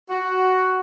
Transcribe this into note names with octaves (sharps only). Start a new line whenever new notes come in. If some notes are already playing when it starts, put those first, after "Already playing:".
F#4